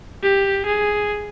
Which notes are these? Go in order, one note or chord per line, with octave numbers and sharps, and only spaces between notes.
G4
G#4